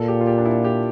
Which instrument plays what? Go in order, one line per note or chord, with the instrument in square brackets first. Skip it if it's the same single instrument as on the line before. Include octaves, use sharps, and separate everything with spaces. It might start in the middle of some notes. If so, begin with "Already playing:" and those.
Already playing: [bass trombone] A#2 [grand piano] A4
[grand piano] G4
F4
G4
D4
E4
G4